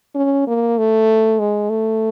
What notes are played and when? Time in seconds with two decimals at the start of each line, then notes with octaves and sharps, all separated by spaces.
0.15 C#4
0.47 A#3
0.78 A3
1.39 G#3
1.70 A3